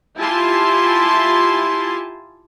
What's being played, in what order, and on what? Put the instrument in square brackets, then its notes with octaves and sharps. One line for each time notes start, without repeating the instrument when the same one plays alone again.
[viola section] E4 F4 G4 G#5 A5 C6